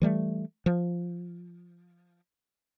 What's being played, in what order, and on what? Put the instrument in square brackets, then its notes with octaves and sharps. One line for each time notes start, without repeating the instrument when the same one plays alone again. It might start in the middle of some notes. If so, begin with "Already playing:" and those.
[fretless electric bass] E3 G3 A3
F3